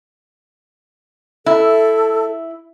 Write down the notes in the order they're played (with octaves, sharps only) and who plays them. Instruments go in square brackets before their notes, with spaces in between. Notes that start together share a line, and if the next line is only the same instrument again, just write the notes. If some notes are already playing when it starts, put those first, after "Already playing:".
[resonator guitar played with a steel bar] E4 [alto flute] A4